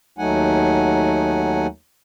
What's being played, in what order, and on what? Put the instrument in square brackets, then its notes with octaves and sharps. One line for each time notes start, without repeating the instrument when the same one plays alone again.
[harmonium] D#2 F#3 A3 D#4 F#5 G#5